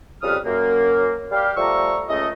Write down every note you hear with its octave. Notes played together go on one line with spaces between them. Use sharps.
F2 C#3 G3 B4 D#6 F6
F#2 A#3
G3 G4 F5
F3 G3 A3 A#5 C#6 E6
C#2 A3 D#5